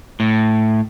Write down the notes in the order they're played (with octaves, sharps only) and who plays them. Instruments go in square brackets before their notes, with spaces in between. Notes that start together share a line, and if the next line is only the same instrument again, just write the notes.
[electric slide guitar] A2